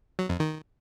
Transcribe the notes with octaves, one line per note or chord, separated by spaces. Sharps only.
F#3
F2
D#3